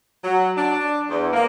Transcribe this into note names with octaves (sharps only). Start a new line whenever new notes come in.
F#3
D4
E2
A#3